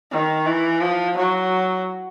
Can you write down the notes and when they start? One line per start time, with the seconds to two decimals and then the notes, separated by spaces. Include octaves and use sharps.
0.11 D#3
0.46 E3
0.81 F3
1.17 F#3